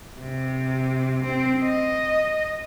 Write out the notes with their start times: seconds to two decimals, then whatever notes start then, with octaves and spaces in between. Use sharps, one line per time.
0.21 C3
1.24 C4
1.64 D#5